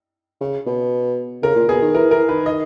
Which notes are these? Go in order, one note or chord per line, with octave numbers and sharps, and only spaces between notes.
C#3
B2
C#3 A#4
A#2
B2 G#4
D#3
E3 A#4
E3 A#4
D#3 B4
D#5